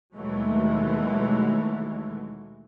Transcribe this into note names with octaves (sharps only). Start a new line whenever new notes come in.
D#2 B2 E3 F#3 G#3 A3